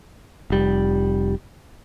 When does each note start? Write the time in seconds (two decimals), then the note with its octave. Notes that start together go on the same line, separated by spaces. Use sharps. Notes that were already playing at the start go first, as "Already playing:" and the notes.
0.50 F1 G3